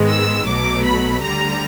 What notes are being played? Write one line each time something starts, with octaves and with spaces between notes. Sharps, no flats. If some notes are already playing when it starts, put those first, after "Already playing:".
Already playing: G#2 D#3 G#3 B3
E6
B1 B2 F#3 A3 D6
B5
D2 D3 G3 A#5